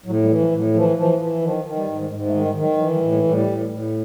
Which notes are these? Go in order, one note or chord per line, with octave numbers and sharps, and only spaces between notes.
A2 F#3
G3
E3
F3
A2
F#3
E3 F3
E3 F3
E3
D#3 F3
D#3
G3
G#2
G#2 G#3
A3
D#3 G#3
G3
D#3
F#3
E3 F#3
G3
A2
G#3
A2
G3
A2
A2